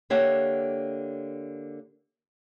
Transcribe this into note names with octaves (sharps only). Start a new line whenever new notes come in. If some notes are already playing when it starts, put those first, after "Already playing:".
D3 A#3 G4 C#5 E5 F#5